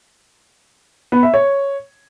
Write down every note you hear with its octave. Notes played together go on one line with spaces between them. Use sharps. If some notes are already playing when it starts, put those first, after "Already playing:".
B3
E5
C#5